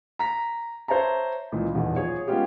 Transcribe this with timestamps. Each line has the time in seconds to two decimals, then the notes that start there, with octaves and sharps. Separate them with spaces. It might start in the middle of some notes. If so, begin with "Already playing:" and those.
0.19 A#5 B6
0.88 C5 C#5 E5 A5 A#5
1.52 C#2 A#2 E3
1.74 D#1 E2 B2
1.96 F3 G#4 C#5
2.27 G#3 B3 C#4 F4 G4 G#4